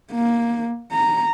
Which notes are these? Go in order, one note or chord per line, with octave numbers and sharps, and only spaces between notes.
A#3
A#5